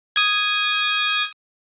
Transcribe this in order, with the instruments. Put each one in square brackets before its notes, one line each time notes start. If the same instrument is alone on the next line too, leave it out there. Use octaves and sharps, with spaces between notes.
[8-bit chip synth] D#6 G#6